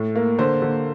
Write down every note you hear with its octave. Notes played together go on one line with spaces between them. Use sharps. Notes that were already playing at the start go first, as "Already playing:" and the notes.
Already playing: A2 A3
A#3
D3 C5
D3